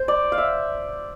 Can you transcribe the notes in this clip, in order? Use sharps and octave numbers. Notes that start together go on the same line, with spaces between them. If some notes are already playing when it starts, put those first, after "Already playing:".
Already playing: C5
D5
F5
E5